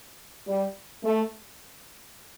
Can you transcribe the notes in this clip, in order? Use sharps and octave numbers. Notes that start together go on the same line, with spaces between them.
G3
A3